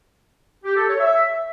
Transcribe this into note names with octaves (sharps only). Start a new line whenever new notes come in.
G4
A4
C#5
E5